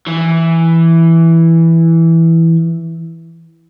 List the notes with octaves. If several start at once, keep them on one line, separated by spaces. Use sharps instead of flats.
E3